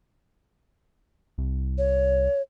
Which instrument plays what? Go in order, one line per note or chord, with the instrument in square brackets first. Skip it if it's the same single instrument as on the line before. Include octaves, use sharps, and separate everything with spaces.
[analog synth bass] C2
[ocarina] C#5